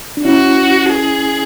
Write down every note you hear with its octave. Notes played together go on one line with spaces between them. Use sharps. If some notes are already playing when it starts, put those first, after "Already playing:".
D4
C#4 E4 F#4
G#4